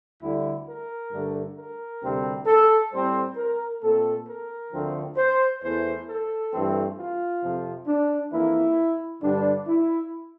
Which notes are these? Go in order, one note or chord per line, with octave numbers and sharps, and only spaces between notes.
D2 D3 G3 E4
A#4
G2 D3 A3
A#4
D2 C3 G3 C4
A4
A2 G3 C4 C5
A#4
A#2 A3 C4 A4
A#4
D2 D3 F3 A3 C4
C5
E2 E3 A3 C5
A4
G2 E3 A3 C4
F4
F2 C3 F3
D4
F2 E3 A#3 E4
G2 D3 G3 D4
E4